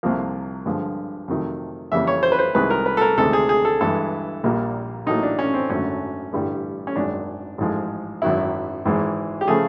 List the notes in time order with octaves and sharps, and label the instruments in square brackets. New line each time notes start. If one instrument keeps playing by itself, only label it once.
[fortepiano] C2 C3 F3 A#3
G2 D3 F3 G#3
F2 C3 D#3 F#3 A3
F2 C#3 E3 G3 A#3 E5
C#5
C5
B4
C5
C2 C3 D#3 G#3 B4
A#4
B4
A4
A#4
D2 C3 D#3 G#3 A4
G#4
G#4
A4
G2 E3 G#3 A4
A#1 A#2 G3 A#3
A1 A2 F#3 A#3 D#4
D4
C#4
C4
G#1 F#2 D3 F#3 A3 C#4
A1 G2 D3 G3
C#4
G#1 F#2 D#3 G#3 D4
A1 G#2 F3 G#3
G#1 F#2 D#3 F#3 E4
G#1 G#2 E3 G#3
G4
C#3 F3 A3 G#4